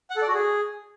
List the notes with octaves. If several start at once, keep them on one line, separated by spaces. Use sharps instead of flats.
F#5
A4
D5
F#4
G#4